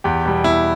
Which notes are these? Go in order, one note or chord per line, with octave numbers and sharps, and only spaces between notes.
E2 G4
B2 G3
E2 E4